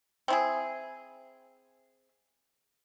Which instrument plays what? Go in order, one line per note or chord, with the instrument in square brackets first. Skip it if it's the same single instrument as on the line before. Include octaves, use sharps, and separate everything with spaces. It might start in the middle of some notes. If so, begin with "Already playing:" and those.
[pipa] C4 E4 G#4